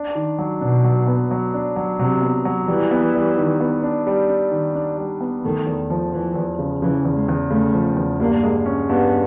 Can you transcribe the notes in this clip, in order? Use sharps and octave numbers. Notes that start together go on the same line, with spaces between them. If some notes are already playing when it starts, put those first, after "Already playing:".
Already playing: D4
D#3
F#3
B2 D4
F#3
B3
F#3
D4
F#3
C3 F#3
B3
F#3
E3 G3
B3
G3
D#3
B3
D4
G3
D4
D#3
D4
G3
B3
D#3 A3
E2
F3
E3 F3
E2
C#3
C#3 E3
E2
G#3
E2
C#3 A3
F3
E2
G2 A#3
G#3
C#4
G2 B3